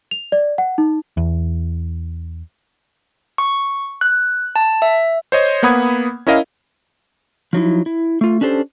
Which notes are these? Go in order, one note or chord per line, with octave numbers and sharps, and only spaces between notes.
F7
D5
F#5
D#4
E2
C#6
F#6
A5
E5
C5 C#5 D#5 G#6
A#3 B3 F#5 B5 D#6 G#6
C#4 E4 A#4 D#5 F5
F3 F#3 D#4 E4
E4
A3 F4
C#4 D4 G4 A4 C5